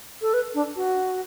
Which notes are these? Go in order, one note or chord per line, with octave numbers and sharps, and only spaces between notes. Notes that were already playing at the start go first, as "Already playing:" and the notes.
A4
B4
D4
F#4